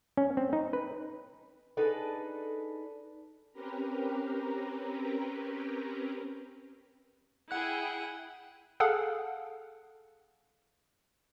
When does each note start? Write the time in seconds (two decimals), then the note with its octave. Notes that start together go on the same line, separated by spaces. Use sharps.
0.17 C#4
0.37 C4
0.53 D#4
0.73 B4
1.77 D4 D#4 G#4 A4 B4 D5
3.52 C4 C#4 G4 A#4 B4 A#5
7.51 E4 G#4 F#5 G5 F#6
8.80 G#4 A4 F5 F#5